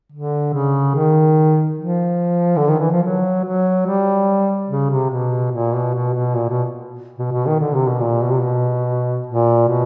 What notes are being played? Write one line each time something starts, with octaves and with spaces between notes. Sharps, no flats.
D3
C#3
D#3
F3
D3
D#3
E3
F3
F#3
F#3
G3
C#3
C3
B2
A#2
B2
B2
B2
A#2
B2
B2
B2
D#3
D3
C3
B2
A#2
B2
C3
B2
A#2
B2